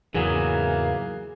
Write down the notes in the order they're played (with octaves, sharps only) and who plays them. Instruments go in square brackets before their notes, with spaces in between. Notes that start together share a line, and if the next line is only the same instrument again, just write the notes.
[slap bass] E2 G#2 C#3 [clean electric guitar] E3 F#3 [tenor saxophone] A#3 [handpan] G#4